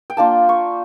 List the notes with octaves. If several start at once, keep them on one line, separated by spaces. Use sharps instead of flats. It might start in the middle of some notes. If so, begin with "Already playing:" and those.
G5
A#3 D4 F4 A5
C#6